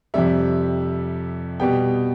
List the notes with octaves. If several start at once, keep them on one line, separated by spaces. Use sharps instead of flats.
F2 C3 G3 E5
B2 G3 B3 G5